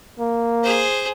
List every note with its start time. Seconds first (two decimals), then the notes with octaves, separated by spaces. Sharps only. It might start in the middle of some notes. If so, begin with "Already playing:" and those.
0.19 A#3
0.63 G#4 C5